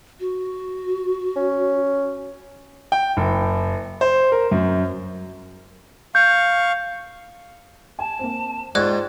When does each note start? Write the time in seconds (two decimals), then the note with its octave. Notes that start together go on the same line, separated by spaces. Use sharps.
0.20 F#4
1.36 C#4
2.92 G5
3.17 F#1
4.01 C5
4.32 A#4
4.51 F#2
6.15 F5 C#6 G6
7.99 G#5 A5
8.19 A#3 C4
8.75 G#2 F4 D5 G5 C#6 F#6 G#6 A#6